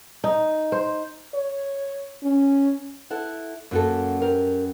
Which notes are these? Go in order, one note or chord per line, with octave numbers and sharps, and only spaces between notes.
D#4
C5
C#5
C#4
E4 A4 F#5
F#2 A#3 F#4 A4
G4 A#4